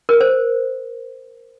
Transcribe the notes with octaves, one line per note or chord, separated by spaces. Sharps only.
A#4
C5